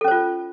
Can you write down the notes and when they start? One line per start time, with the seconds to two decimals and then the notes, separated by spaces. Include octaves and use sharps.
0.01 A4
0.04 C#4
0.08 C5
0.11 F4